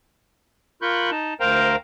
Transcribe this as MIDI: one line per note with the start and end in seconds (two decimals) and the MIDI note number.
0.82 1.10 65
0.82 1.10 70
0.82 1.10 83
0.82 1.10 85
0.82 1.10 90
0.82 1.10 91
1.11 1.34 63
1.11 1.34 81
1.40 1.76 38
1.40 1.76 70
1.40 1.76 72
1.40 1.76 77
1.40 1.76 79
1.40 1.76 82